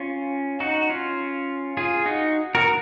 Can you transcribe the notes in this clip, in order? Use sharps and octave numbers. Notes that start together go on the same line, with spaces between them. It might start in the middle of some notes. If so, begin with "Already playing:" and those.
Already playing: C#4 F4
D#4 F#4
C#4 F4
F4 G#4
D#4 F#4
F#4 A#4